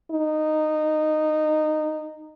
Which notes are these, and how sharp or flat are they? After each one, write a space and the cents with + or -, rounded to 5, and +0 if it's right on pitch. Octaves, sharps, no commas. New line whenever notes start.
D#4 -15